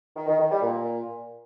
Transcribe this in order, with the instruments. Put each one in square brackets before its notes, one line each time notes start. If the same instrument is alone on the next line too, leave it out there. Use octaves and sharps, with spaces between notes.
[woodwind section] D#3
D#3
D#3
G3
A#2